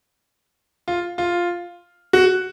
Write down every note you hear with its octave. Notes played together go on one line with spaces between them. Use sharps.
F4
F4
F#4